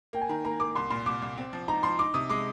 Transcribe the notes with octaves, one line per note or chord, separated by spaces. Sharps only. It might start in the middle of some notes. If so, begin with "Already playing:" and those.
A#3 G5
G#5
D#3 A#5
A#3 A#5
A#3 D6
C2 C6
A#2 C6
C2 D6
C2
C4
F3
D#4 A#5
F3 C6
D#4 D6
C3 D#6
G#3 D6